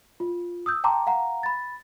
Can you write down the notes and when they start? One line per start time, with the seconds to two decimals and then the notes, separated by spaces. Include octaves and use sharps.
0.20 F4
0.66 D#6 E6 G6
0.84 G5 A5 A#5 C6 D6
1.07 F5 F#5 A#5
1.43 B5 A6